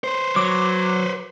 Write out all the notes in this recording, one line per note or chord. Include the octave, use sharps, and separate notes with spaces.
B4 C5
F#3 D6